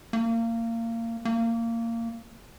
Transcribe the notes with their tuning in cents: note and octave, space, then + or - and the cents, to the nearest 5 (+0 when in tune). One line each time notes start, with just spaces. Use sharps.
A#3 -25
A#3 -20